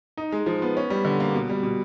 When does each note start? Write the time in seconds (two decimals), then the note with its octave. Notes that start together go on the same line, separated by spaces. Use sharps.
0.17 D#4
0.32 G#3
0.46 F3
0.62 B3
0.77 C#4
0.90 G3
1.05 D3
1.20 A#3
1.34 B2
1.49 G3
1.63 B2